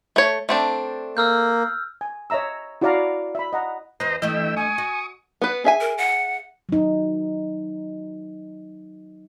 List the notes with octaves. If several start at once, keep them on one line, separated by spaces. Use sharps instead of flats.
A3 C#5
A3 C4 D4
A#3 E6 F6 G6
G#5
C#5 D#5 E5 A#5 E6
E4 F#4 C#5 D5 F5 A#5
E5 B5
D#5 F#5 A#5
E2 B4 C5 D#5 A#5
G2 E3 A3 D#5 G5 E6
G#5 C#6 D#6
F#4
B3 B4
G#4 E5 G#5
A#4
F#5
F#3 D#4